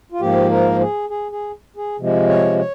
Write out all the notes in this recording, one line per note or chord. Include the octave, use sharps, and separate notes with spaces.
F4
G#2 F3 A#3 G4
A#4
G#4
G#4
G#4
G#4
C3 F3 G#3
C#5
C#5